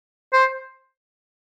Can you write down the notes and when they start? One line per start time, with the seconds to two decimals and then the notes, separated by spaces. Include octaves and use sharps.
0.33 C5